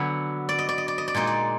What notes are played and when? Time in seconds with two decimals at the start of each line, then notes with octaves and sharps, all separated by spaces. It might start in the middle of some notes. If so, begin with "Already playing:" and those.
Already playing: D3 F#3 B3 G#5
0.49 D5
0.59 D#5
0.69 D5
0.78 D#5
0.88 D5
0.98 D#5
1.08 D5
1.14 A#2 G#3 D#4 D#5
1.27 D5